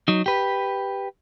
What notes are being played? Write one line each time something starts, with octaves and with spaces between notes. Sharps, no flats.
F#3 D#4
G4 B4